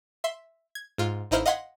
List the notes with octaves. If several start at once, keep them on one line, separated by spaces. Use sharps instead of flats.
E5 C6
G#6
G#2 F4
A1 D#4 E4 C5 F6 G6
D#5 F5 F#5 C6 G#6 B6